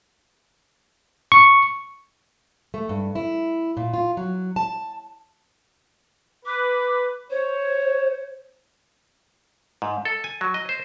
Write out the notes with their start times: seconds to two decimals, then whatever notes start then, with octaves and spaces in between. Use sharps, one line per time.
1.32 C#6
2.74 A3
2.89 G2
3.15 E4
3.77 A#2
3.93 F4
4.17 F#3
4.56 A5
6.46 B4 D6
7.31 C5 C#5
9.82 G#2
10.05 A4
10.24 G#5
10.41 F#3
10.54 D#5
10.69 C5